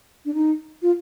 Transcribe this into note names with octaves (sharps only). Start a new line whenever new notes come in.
D4
D#4
F4